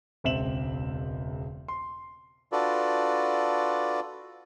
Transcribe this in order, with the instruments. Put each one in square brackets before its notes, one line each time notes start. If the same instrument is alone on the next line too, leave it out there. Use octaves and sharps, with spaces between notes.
[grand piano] E1 C#2 C4 E5 E7 F#7
C6
[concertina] D4 F4 F#4 A4 B4 D5